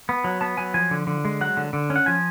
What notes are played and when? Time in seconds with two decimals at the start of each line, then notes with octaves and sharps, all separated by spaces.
0.09 B3
0.24 F#3
0.41 B3 A5
0.57 F#3 G#5
0.74 F3 G#5
0.91 D3
1.07 D3
1.25 G#3
1.41 F#3 F#5
1.57 D3
1.73 D3
1.90 C#4
1.96 F#5
2.06 F3 G#5